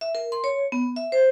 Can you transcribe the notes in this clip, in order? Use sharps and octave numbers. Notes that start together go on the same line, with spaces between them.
E5
A#4
C6
C#5
B3
E5
C5